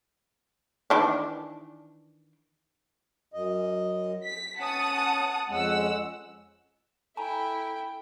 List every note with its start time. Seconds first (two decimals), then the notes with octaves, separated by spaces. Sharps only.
0.90 D#3 E3 D4
3.34 F#2 D#5
4.26 B6
4.59 C#4 F#5 A5 D#6
5.49 F2 G#3 C#4 F#5 E6
7.17 E4 A4 G5 G#5 A#5